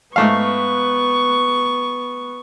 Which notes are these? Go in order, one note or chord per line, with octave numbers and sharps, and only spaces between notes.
G#2 A3 B3 F5 C#6